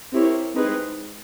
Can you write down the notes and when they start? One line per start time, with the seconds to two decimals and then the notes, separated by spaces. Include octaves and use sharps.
0.13 C4 E4 G4 A#4 C#5
0.54 G#3 C4 D#4 G#4 B4